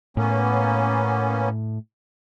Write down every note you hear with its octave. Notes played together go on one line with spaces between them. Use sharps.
A2 A#3 B3 C#4